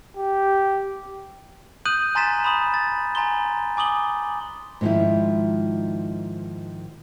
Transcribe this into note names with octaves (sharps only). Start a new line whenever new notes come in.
G4
D#6 F#6 G6 D#7 F#7
G#5 A#5 C6 A6 B6 E7
B5 C6 D#6 F#7
A6
G#5 A#5 C6 G7
G#5 D6 D#6 F#7 G7
G#2 D#3 F3 G#3 E4